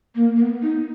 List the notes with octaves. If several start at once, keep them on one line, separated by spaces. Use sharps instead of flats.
A#3
A#3
B3
D#4